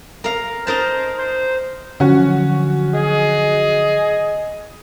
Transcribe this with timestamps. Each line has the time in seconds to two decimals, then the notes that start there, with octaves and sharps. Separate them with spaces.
0.24 A#4 F5
0.67 D#4 A#4 C5 A5
1.18 C5
2.00 D3 F3 F#3 C#4 F#4
2.94 G#4 D#5